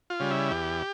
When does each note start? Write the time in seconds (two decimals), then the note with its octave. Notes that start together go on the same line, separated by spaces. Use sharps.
0.10 F4
0.20 C#3 G3
0.31 E4
0.51 E2 G4